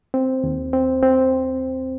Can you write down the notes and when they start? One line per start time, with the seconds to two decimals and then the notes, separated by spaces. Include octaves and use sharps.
0.14 C4
0.44 D#2
0.73 C4
1.03 C4